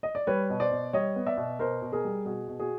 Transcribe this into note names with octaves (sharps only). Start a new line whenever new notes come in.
D#5
D5
G3 B4 C#5
B2
C5 D5
B2
G3 C#5 D#5
B3
D5 E5
B2
B2 A#4 C5
B2
G#4 A#4
G3
B2 F#4 G#4
B2
F#4 G#4